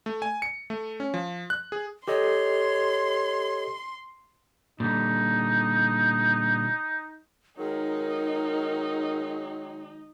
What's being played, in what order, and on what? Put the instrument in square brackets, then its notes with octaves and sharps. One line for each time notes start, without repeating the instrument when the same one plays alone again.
[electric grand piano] A3
G#5
C#7
A3
C#4
F3
F#6
G#4
[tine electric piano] G4 A4 D#5 [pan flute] C#5 [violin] C6
[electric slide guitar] A#2 D3 G3 [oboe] D#4
[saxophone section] D#3 F#3 G#3 [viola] D#4 [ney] A#4